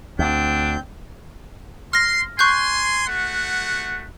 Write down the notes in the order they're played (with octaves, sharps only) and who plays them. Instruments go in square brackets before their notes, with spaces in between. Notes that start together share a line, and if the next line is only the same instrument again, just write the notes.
[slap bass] D2 [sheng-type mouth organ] C4 G6 [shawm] D4
[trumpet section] C6 [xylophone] F6 A#6
[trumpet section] G#5 C6 [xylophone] C#6 F#6 G6
[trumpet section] A3 F#4 F#5